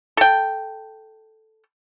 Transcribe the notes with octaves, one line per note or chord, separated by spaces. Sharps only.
A4 G5